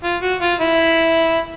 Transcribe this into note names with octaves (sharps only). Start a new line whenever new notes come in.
F4
F#4
F4
E4